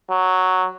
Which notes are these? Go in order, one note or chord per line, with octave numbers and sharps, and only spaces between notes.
F#3